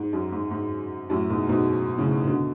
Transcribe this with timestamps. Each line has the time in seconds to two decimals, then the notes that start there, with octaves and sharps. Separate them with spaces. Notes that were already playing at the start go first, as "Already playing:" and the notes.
Already playing: G#2
0.13 F#2
0.32 G#2
0.51 G#2
1.10 F#2 A2
1.30 G#2 B2
1.49 G#2 B2
1.97 A2 C#3
2.27 B2 D3